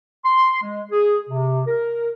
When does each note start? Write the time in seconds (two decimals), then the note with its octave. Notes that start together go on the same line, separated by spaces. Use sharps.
0.25 C6
0.62 G#3
0.92 G#4
1.29 C3
1.67 A#4